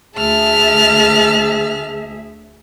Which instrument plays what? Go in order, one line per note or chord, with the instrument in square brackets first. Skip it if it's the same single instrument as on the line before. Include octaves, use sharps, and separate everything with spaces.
[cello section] D2 G#4 E5 [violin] A5 F6